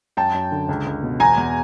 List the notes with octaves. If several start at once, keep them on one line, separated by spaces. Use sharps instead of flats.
F#2 G5 A5
F#2
D3
C#2
C#2
B2
E2 G#5 A#5
E2